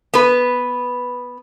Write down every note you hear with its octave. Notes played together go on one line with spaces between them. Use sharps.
B3 B4